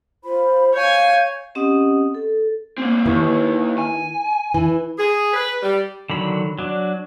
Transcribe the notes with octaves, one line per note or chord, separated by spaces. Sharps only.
F4 C5 B5
C#5 F5 G#5 G6
C4 C#4 G4 D#5 F#5 D#6
A4
A#3 C4
D#2 D#3 E3
G#5
E3 E4
G#4
B4
G3
D3 D#3 F#3 B5
F#3 D4